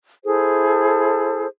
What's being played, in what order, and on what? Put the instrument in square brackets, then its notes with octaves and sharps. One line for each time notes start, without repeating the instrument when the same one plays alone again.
[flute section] E4 G#4 A4 C5